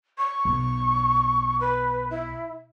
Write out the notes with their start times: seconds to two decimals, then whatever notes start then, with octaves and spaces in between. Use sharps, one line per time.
0.18 C#6
0.45 B1
1.61 B4
2.11 E4